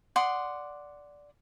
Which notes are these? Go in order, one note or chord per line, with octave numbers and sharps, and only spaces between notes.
D5 F#5 C6 D#6